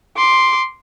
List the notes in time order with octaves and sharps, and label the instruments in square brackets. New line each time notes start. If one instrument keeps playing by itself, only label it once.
[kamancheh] C6 D6